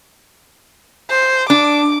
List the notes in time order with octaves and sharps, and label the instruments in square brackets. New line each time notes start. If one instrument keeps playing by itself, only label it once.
[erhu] C5
[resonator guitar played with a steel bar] D4 [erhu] D6